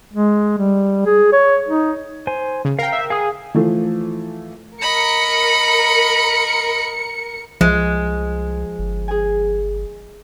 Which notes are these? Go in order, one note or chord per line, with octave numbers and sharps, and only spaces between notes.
G#3
G3
G#4
C#5
D#4
C5 G#5
C#3
A#4 F5 G5
E5
G#4 F5 D#6
E3 F3 A3
A#4 D#5 B5 C#7
C2 F3 G#3
G1
G#4 G#5